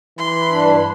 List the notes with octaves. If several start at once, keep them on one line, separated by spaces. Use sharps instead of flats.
E3 B5 C6
G2 D4